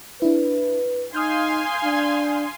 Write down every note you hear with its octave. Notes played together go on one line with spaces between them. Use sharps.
D4 E4 B4
D#4 F5 G#5 C6 D#6 F6 G6
D4